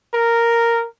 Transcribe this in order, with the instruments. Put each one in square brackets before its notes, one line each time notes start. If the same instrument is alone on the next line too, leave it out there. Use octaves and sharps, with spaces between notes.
[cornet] A#4